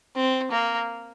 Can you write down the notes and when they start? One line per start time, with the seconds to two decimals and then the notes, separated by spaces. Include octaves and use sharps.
0.16 C4
0.51 A#3